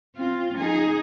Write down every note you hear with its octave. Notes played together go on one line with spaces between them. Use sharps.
C4 F4
D#4 G#4